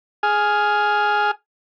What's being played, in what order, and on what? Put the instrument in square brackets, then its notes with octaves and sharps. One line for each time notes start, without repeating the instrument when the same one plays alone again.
[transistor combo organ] G#4 G#5 F6